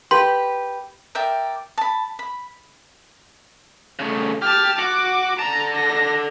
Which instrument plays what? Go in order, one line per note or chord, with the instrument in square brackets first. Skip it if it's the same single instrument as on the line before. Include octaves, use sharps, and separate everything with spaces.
[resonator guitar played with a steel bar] G4 B4 [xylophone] C6
[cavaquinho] A#4 D5 E5 G5
A5 B5
B5
[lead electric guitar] C#3 A3
[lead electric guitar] G4 [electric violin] A5 F6
[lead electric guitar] F#4 F#5 [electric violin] D6
[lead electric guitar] D3 A5 [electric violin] A#5
[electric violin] A#6